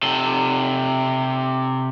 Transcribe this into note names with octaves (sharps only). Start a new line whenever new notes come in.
C3 A4